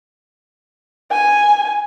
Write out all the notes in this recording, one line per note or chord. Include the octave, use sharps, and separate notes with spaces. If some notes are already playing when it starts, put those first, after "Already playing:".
G#5